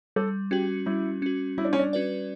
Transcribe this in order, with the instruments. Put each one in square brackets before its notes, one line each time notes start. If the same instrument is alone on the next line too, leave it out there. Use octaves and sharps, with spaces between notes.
[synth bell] G3 [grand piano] A4
[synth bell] C#4 F#4 [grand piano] G4
[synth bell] G3 [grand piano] E4
[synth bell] C#4 F#4
[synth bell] G3 [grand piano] E4
[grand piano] D4
C#4
D4
[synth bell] C#4 F#4 B4 D5